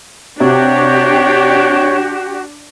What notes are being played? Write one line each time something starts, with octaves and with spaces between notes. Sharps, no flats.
C3 D4 F#4 G4 C#5